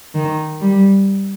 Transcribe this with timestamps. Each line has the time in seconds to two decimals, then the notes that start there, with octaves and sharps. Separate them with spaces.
0.15 D#3
0.61 G3